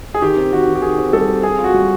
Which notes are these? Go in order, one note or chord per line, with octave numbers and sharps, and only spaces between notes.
G#4
D#3 G4
C4
D#3 F#4
D#3
G4
D#3 G#4
C4
G3 A4
C4
C4 G#4
F4
F#4
G3